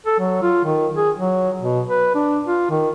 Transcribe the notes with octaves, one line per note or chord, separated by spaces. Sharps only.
A4
F#3
F4
D#3
G#4
F#3
B2
B4
D4
F4
D#3